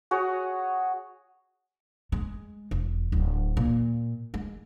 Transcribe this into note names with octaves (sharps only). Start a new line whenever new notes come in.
F#4 G#4 C#5
G#3
E1
D1
A#2
G#3